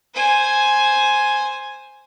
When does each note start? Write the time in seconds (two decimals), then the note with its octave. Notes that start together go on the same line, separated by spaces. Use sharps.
0.14 C5 G#5